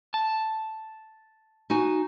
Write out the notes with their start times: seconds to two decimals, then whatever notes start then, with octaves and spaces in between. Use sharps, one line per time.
0.14 A5
1.70 D#4 F#4 G#5